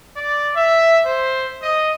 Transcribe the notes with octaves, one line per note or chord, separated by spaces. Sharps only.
D5
E5
C5
D#5